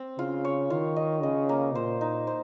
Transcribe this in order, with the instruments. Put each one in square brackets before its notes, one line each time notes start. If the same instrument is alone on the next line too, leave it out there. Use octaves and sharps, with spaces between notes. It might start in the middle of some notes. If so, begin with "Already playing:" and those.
Already playing: [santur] C4
[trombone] C#3 [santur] F4
[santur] C#5
[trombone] D#3 [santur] F4
[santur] D#5
[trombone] C#3 [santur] D#5
[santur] A#3
[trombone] A#2 [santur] C5
[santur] D#4
C5